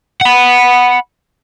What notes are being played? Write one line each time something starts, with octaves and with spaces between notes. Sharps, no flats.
F#5 B5